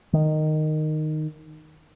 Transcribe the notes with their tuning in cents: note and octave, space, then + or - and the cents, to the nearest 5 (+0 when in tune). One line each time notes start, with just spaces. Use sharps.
D#3 -10